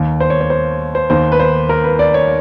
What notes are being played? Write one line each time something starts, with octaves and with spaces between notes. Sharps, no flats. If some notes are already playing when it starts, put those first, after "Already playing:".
Already playing: D#2 D#3
C5
C#5
C#5
C5
C5
D#2 D#3 C5
B4
C5
A#4
B4
D5
C#5